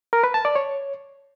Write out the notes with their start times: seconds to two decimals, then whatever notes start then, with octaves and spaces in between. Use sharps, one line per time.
0.13 A#4
0.24 B4
0.34 A5
0.45 D5
0.56 C#5